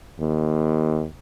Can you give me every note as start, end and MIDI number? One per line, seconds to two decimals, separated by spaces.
0.20 1.05 39